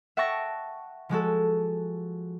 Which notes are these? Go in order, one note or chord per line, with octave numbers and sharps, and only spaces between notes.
E5 F#5 G5 A5 C#6 A#6
F3 G#3 F#4 A4